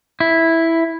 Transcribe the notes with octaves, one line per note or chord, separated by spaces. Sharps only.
E4